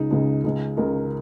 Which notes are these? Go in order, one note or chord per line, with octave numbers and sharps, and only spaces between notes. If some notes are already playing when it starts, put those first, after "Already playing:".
Already playing: C#2 C#3 D#4
C#2 C#3
C#2 C#3
C#2 C#3 A#4